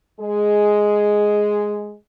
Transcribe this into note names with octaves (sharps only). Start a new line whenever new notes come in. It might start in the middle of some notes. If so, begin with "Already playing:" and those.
G#3 G#4